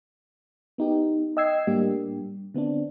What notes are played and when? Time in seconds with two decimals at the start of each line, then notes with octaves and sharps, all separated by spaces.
0.78 B3 D#4 G4
1.37 D#5 G5 E6 G#6 C7
1.67 A2 G3 A#3 D4 G4
2.54 D3 B3 C4 D4